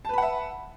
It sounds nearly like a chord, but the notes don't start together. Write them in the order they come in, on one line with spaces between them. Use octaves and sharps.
A5 B4 B5 F#5 E5